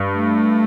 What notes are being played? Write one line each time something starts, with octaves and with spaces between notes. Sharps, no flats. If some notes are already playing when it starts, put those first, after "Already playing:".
Already playing: G2
A3